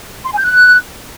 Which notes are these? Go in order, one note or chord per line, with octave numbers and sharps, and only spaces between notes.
C6
G#5
G6
F#6